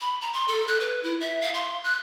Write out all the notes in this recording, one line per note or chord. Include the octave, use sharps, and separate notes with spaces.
B5
A#5
C6
A4
F#6
B4
E4
E5
F5
C6
F#6